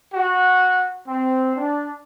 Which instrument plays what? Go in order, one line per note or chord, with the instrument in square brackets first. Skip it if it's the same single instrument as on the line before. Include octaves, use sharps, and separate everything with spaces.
[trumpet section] F#4
C4
D4